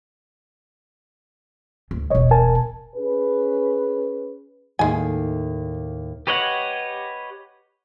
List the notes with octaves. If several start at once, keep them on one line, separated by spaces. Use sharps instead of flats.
D2
E1 A#1 C#5 D#5
A#4 G#5 A5
C#4 G#4 B4
D#2 A2 G#3 G#5 C7
G4 B4 C#5 D#5 F#5